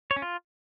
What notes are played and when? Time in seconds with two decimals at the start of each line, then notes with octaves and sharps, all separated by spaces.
0.11 C#5
0.16 C#4
0.22 F4